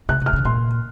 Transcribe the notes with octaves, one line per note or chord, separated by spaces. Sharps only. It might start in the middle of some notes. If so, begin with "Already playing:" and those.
C3 F#6
C3 F6
C#3
A#2 C6